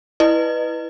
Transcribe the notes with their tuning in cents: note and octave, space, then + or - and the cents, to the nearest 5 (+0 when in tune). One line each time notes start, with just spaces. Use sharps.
E4 -5 B4 +0 D#5 -30